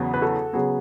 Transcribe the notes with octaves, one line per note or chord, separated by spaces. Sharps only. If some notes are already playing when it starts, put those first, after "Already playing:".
Already playing: E2 C#3 F#3 B3
B4
F#4 A4
C#3 F#3 B3 G#4